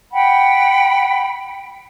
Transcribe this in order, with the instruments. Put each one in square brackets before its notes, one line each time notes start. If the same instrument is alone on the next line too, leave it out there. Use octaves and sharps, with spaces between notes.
[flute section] F#5 G5 B5